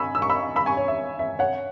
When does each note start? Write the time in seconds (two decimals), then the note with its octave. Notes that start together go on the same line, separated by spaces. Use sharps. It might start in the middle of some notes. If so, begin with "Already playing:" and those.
Already playing: G#5 B5 C#6 E6
0.15 E6
0.22 C#6
0.30 B5 E6
0.56 B5 E6
0.66 G#5 C#6
0.77 C#5
0.88 E5
1.19 E5
1.39 C#5 F#5